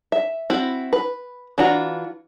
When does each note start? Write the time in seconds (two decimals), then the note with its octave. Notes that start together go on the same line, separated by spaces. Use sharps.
0.12 E5
0.50 C4 E4 F#4
0.93 B4
1.58 E3 D4 F4 F#4 A#5